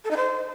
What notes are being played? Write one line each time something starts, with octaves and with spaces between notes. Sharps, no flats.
A4
D#4
C5